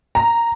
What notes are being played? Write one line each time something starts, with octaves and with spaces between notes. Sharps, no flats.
A#5